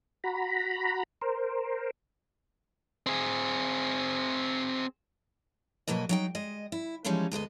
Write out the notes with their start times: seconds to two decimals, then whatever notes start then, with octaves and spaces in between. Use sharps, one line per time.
0.24 F#4 A#5 B5
1.21 A#4 C5
3.07 C4 G#4
5.88 B2 F#3 A#3 B4 D#5
6.09 F#3 D#4 G5
6.35 G#3 D#5
6.72 E4
7.05 E3 F3 G3 G#3 C#4 D#4
7.32 D2 G#3 B3 D#5